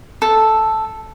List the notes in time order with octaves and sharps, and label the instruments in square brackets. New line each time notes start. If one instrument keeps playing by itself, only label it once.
[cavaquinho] A4